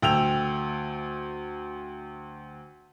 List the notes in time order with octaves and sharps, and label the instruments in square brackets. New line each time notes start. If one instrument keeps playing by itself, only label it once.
[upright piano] D2 G5 E6 F7